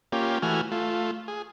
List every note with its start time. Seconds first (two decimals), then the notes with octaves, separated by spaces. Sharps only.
0.12 A#3 C#4 F4 G4
0.42 E3 A3 F#4 G#5 F6
0.72 A3 F4
1.28 G#4